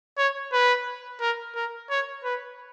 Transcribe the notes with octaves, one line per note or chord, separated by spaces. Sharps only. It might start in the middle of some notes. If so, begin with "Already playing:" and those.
C#5
B4
A#4
A#4
C#5
B4